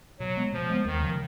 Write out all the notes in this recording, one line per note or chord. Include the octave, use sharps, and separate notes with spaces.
B2 F#3
G#3 B3
B2 F3
G#3 B3
D#2 D#3
C#3 F3